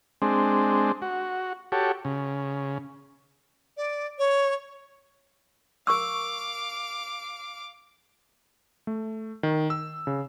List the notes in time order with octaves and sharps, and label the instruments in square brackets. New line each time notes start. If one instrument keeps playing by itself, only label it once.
[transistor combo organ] G#3 C4 D4
F#4
F#4 G4 A4 C#5
C#3
[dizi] D5
C#5
[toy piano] A#4 C#6 E6 [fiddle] F5 D6
[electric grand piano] A3
D#3
E6
C#3